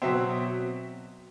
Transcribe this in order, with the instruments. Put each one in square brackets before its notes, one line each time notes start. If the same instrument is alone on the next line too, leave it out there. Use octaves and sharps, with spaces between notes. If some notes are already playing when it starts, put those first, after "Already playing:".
[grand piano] B2 F#3 C4 E5